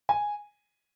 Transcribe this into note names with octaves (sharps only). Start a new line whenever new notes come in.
G#5